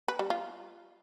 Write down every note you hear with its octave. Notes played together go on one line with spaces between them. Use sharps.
B4
G3
F4